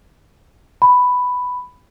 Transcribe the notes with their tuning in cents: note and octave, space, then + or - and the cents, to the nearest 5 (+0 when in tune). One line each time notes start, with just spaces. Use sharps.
B5 +5